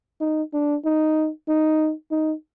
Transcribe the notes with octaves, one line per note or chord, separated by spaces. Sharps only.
D#4
D4
D#4
D#4
D#4